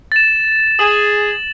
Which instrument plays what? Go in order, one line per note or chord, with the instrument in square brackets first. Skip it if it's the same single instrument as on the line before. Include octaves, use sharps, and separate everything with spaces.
[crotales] A6 E7
[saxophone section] G#4 [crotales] F#7